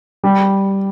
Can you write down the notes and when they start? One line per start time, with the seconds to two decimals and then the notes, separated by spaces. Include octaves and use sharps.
0.24 G3